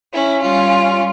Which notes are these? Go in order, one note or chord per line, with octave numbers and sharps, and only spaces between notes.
C#4 E4
G3 C#4 F4